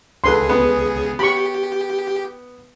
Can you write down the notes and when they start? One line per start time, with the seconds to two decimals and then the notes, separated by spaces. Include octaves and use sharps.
0.24 C#2 G#4 A4 B4 C6
0.49 B3
1.19 G4 B5 C#6